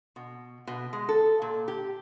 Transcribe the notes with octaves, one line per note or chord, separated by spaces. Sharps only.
B2
B2
G#3
A4
A#2
G4